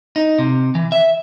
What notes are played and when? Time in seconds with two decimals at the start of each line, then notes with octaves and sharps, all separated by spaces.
0.16 D#4
0.38 C3
0.75 E3
0.92 E5